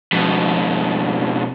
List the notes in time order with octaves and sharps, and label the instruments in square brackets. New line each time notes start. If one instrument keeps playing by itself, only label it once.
[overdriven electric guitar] F2 B2